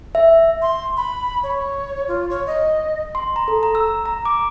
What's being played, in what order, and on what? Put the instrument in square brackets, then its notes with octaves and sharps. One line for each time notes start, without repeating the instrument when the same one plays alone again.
[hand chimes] E5
[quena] C6
B5
C#5
F4
C#5
D#5
[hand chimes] C6
A#5
A4
A#5
E6
A#5
D6